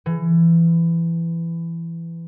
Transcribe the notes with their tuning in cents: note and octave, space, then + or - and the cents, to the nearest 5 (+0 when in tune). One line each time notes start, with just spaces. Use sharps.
E3 +20